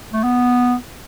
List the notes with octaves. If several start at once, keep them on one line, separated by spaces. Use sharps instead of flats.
A3
B3